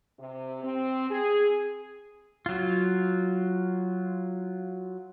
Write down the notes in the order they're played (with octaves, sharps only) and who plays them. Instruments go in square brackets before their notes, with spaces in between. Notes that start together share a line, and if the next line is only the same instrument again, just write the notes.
[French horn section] C3
C4
G#4
[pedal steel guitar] F#3 F4